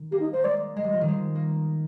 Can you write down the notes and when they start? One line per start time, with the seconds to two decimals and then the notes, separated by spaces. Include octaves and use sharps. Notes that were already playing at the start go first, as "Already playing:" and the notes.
Already playing: D#3
0.11 A#3 G4
0.20 D#4
0.33 A#3 C5
0.44 G#3 D5
0.76 G#3 D#5
0.84 G3
0.93 F3
1.01 D#3
1.08 G#3
1.35 A#3